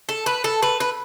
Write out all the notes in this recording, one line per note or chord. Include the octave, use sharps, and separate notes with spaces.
A4
B4
A4
B4
B4